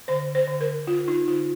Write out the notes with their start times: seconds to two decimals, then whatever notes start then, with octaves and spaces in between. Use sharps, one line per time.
0.08 D3 C5
0.35 C5
0.47 D3
0.61 A#4
0.87 D3 F4
1.08 D#4
1.27 D3 F4